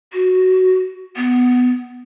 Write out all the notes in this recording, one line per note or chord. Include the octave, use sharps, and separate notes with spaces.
F#4
B3